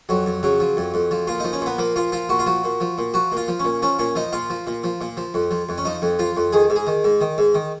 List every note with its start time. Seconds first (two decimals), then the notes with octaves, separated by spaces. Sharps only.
0.09 F2 F#3
0.26 F2
0.43 C#3 F#3
0.60 F3
0.77 F2
0.94 F2
1.11 F3
1.27 A#2 F4
1.40 F3 D#4
1.53 C#4
1.61 A#2 B3
1.78 F3 A#3
1.96 A#2 F4
2.12 F3 F4
2.29 A#2 F#4
2.39 F4
2.46 F3 F#4
2.64 A#2
2.81 F3
2.98 A#2
3.14 F3 F#4
3.32 A#2
3.37 F4
3.48 F3
3.59 C#4
3.64 A#2
3.82 F3 C#4
3.99 A#2 C#4
4.15 F3 D#4
4.33 A#2 F4
4.50 F3
4.67 A#2
4.84 F3
5.01 A#2
5.17 F3
5.34 F2
5.51 F3
5.69 F2
5.78 C#4
5.85 F3 D#4
6.02 F2
6.19 F3 F4
6.37 F2
6.52 D#3 G#4
6.70 G#2
6.76 G#4
6.87 D#3
7.04 G#2
7.21 D#3
7.38 G#2
7.55 D#3